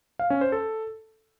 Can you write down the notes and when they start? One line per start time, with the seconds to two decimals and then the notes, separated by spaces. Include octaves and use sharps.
0.19 F5
0.30 C#4
0.41 C5
0.52 A4